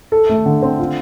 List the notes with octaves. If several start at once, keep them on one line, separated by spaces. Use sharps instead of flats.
A4
A3
D3
C4
F4